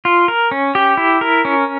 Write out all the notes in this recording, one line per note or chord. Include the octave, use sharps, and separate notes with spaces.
F4
A#4
C#4
G4
E4
A#4
C#4